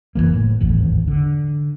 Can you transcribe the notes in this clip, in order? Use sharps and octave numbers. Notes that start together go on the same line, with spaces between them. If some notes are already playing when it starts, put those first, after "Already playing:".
F#1 C2 E3 A#3
A2
D1 G#1 E2 A2
D3